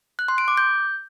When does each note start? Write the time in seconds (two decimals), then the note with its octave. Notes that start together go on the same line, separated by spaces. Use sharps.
0.19 F#6
0.28 C6
0.38 D7
0.48 D6
0.57 G6